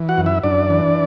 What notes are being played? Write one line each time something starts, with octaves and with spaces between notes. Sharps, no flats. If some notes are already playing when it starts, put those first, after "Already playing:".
Already playing: E3
F#4 F#5
F#2
E4 E5
F#2 D4 D5
E3